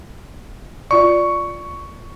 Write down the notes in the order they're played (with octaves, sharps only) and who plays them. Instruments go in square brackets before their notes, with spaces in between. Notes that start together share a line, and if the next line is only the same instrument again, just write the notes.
[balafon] F4 D5 [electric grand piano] C#6